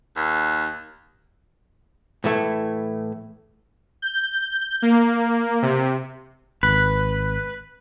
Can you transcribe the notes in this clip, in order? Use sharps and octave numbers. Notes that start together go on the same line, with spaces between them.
D#2
A2 E3 A3
G6
A#3
C3
G#1 B4